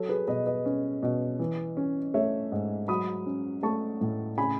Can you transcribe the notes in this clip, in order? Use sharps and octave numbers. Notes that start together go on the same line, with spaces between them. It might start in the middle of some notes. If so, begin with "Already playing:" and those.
Already playing: F#3 A4 C#5
G#4 B4
B2 B4 D#5
B4 D#5
C#4
B2
E3
C#4
A3 C#5 E5
G#2
F#3 B5 D#6
C#4
A3 A5 C#6
A2
C#3 G#5 B5